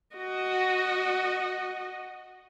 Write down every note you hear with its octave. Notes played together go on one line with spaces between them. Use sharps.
F#4 D#5